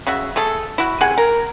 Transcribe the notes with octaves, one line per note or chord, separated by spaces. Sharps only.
C#3 F#4 E5
A3 G#4 A4
E4 F#4
C3 G#4 F#5 G#5
A#4